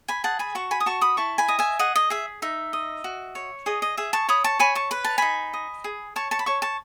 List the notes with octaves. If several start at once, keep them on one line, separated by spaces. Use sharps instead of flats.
G#5 B5
G#4 F#5 A5
G#5 B5
F#4 A5 C#6
G#5 B5
D#6
F#4 A5 C#6
B5 D#6
E4 A5 C#6
G#5 B5
D#5
E5 G#5
G#4 D#5 F#5
D#5
G#4 E5
D#4 E5
D#5
F#4
C#5
G#4 D#5
D#5
G#4 E5
A5 C#6
C#5 B5 D#6
A5 C#6
C#5 G#5 B5
A5 C#6
B4 B5
A5
D#4 G#5 B5
D#5
G#4
C#5 A5 C#6
A5 C#6
B5
C#5 A5 C#6
A5 C#6